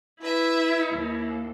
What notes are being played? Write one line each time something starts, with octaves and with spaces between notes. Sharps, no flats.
E4 B4 E5
D#2